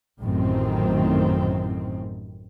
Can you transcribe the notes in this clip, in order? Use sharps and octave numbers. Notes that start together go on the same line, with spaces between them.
A1 F#2 A2 D#3 C4